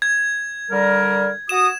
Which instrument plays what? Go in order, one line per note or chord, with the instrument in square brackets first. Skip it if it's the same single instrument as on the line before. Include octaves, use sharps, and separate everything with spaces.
[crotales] G#6
[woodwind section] D3 G3 A#4
[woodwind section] F#4 D#6 [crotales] E7